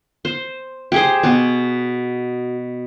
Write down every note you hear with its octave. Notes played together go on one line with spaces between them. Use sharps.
C5
G4 G#4 C5
B2 F#4 D6